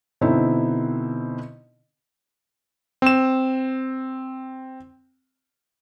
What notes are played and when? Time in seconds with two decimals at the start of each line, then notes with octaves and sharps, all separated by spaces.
0.21 B2 D3 C4 D#4 E4
3.02 C4 E7